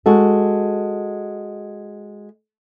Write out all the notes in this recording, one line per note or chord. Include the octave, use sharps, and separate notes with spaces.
G#3 F#4 A4